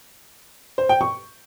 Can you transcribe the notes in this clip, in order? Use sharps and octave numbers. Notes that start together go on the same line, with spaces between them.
C5
G5
C#6